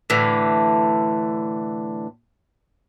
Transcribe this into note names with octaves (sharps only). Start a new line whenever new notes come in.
A2 D3 E3